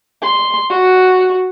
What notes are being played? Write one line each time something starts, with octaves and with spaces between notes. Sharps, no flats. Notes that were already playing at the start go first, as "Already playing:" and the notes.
C6
F#4